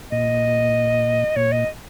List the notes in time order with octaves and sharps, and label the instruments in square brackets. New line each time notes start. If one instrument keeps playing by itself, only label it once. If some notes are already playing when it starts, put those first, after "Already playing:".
[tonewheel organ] A#2 [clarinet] D#5
[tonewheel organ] A#2 [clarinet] C#5
[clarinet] D#5